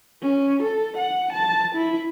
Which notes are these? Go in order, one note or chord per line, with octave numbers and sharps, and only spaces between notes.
C#4
A4
F#5
A5
E4